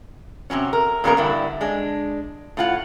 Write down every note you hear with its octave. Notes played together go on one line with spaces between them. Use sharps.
C3 D#3 F#3 C#4
A#4
A#2 C#3 G3 A#3 B3 A#4
G2 D3 E4
G#3 D4
A2 F4 F#5